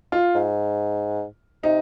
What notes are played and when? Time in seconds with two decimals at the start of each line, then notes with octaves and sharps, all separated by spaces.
0.12 F4
0.35 G#2
1.63 C3 D#4